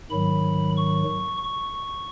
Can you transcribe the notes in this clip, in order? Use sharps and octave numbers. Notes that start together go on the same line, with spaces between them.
G#2 D#3 F#3 B5
C#6
C#6